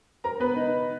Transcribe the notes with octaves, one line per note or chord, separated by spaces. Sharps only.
A#4 A#5
B3 B4
D#4